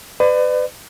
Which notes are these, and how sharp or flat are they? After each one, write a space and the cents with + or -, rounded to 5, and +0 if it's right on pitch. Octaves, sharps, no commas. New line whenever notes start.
B4 +35 D5 +35